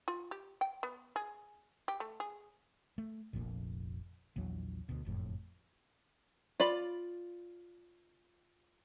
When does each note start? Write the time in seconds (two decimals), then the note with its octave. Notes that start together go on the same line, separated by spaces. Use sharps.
0.08 F4
0.31 G4
0.61 G5
0.83 B3
1.16 G#4
1.88 G4
2.00 A3
2.20 G#4
2.98 A3
3.33 F1 A#1 F2 A#2
4.36 A#1 E2 F#3
4.89 D2 B2
5.05 F#1 F2 A2
6.60 F4 D5 B5